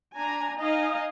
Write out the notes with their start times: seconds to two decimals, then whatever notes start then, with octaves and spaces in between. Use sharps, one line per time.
0.15 D4 G#5 A#5
0.59 D#4 D#5 F5 G#5